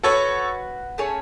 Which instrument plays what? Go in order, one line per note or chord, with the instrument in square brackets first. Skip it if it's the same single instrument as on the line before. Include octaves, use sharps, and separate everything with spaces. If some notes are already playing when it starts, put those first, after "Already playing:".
[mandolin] F#4 B4 F#5 [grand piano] A4 C#5
[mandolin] A3 C#4 G#4 C#5